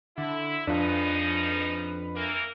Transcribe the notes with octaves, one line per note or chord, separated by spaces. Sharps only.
D3 E4
F2 C#3 F3 D4 D#4 F4 B4
E3 A#3 A#4